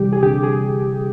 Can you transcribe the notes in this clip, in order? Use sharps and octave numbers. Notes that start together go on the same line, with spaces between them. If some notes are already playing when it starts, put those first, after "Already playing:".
Already playing: C3 E3 G3 G4
G#4
D3 G4
G#4